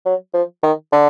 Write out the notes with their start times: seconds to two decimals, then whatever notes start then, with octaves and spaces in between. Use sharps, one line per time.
0.06 F#3
0.34 F3
0.63 D#3
0.92 D3